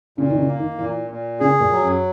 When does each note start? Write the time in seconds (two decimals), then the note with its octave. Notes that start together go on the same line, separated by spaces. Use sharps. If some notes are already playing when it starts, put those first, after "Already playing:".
0.18 A#2 C#3
0.30 D#3
0.38 C#3
0.48 A#3
0.59 D#3
0.79 A#2 E3
1.10 A#2
1.40 C#3 G#4
1.60 A#2
1.71 F#3
1.82 F#2